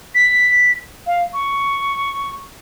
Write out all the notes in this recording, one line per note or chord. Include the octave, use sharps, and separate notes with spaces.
B6
F5
C#6